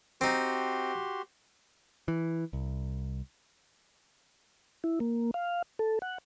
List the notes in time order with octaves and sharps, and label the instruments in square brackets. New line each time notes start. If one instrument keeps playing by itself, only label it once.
[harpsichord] C4 D#4 [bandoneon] F#4 G4 C6
[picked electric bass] E3
C2
[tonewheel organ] E4
A#3
F5
A4
F#5